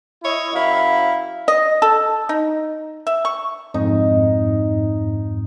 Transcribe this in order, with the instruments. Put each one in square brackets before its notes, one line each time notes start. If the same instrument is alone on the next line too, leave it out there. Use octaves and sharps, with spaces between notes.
[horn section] E4 C#5 D#5
F#2 E4 F5
[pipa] D#5
A4
D#4
E5
C#6
[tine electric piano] F2 G#2 [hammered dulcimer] D#4